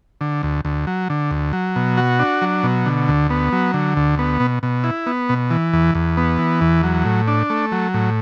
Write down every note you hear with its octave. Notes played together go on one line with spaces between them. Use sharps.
D3
D2
D2
F#3
D3
D2
F#3
B2
F#4
D4
F#3
B2
D3
D2
B3
F#3
D3
D2
B3
B2
B2
E4
B3
B2
E3
E2
E2
B3
E3
E2
F#3
A2
D4
A3
F#3
A2